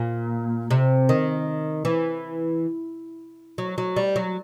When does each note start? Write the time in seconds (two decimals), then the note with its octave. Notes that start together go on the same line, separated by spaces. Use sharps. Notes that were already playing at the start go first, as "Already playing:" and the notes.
Already playing: A#2
0.71 C3
1.09 D#3
1.85 E3
3.58 F#3
3.78 F#3
3.97 G3
4.16 F#3